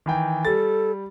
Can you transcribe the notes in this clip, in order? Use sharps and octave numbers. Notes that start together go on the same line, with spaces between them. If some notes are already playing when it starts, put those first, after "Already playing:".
D#3 E3 G5
G3 A4 A6